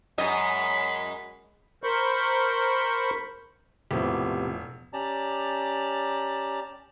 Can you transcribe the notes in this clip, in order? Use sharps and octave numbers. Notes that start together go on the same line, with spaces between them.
F#2 G#3 D#5 B5
A#4 C5 B5 C#6 G6
E1 A2 C3 F3 B3 G4
C#4 G4 D5 A5 A#5